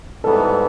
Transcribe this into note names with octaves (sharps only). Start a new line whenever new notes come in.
G#2 E3 G3 B3 A4